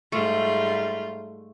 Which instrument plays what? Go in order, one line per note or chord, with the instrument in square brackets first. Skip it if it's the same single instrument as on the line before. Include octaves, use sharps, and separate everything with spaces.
[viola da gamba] G#2 G3 F4 [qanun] A3